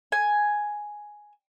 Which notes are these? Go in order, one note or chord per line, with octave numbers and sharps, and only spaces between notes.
G#5